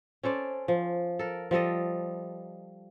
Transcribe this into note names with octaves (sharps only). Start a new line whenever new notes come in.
C#4 A4 C5 D5
F3
A4 A#4
F3 G3 A4 D#5